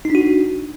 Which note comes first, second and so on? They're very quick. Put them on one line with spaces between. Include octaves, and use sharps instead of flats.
D#4 D4 F#4